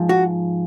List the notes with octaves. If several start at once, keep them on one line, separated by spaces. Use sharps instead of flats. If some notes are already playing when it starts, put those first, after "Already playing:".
Already playing: G#2 F3
F#4